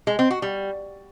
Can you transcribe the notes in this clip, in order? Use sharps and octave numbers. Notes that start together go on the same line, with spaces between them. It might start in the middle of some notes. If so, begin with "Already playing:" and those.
G#3
C4
F#4
G3